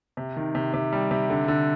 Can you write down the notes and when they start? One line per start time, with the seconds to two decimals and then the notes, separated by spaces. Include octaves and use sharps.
0.17 C3
0.36 D#3
0.55 C3
0.74 C3
0.93 G3
1.11 C3
1.30 D3
1.48 D3